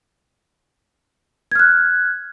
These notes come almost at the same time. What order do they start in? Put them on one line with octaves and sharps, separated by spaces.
G#6 F6 F#6